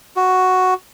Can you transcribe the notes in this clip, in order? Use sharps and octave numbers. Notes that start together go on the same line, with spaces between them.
F#4